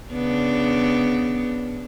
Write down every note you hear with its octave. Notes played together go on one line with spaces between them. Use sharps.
C#3 B3 D4